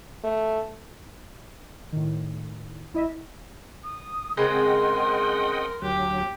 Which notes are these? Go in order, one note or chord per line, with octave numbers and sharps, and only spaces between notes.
A3
A2 D#3
A1 E4 D#5 E5
D#6
C#3 G#3 C4 A#4 D#5 F#5 G5 C6
D2 F#3 G4